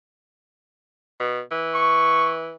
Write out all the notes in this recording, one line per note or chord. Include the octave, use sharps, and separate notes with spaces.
B2
E3
C#6